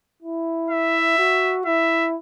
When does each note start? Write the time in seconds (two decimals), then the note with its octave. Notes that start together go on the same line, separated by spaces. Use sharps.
0.23 E4
0.70 E5
1.18 F#4
1.66 E4 E5